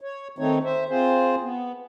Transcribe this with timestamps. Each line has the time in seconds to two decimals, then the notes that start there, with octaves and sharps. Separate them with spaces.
0.01 C#5
0.39 D#3 A3 C4 D#4 C#5
0.64 C5 E5
0.89 C4 F4 G#4 C5
1.42 B3